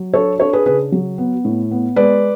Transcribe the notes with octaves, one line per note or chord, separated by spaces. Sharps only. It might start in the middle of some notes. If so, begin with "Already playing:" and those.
Already playing: F#3
D4 A4 C#5
D4 A4 C#5
G#4 B4
C#3 G#4 B4
F#3
B3
A2
B3
G#3 B4 D5